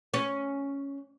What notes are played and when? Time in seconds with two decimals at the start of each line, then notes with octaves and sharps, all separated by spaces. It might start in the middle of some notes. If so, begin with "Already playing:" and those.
0.14 C#4